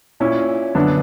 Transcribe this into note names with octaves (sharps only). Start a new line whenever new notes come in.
A#2 C#4 E4
F#2 D3 B3 D4